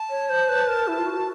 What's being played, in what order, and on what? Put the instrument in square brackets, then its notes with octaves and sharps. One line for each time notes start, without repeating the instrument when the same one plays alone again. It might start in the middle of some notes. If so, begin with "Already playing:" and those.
Already playing: [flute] A5
[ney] C#5
C5
B4
A#4
E4
F4
F#4